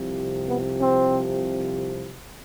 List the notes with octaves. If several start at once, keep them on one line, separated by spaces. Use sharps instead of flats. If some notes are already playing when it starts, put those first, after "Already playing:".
Already playing: C2 C3 F3
B3
C4